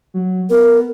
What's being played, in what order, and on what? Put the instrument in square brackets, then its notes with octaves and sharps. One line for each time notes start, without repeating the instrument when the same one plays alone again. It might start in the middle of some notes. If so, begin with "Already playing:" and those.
[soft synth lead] F#3
[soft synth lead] B3 [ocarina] A#4